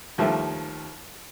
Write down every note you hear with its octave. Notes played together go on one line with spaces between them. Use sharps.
D#2 F3 G3 A3 E5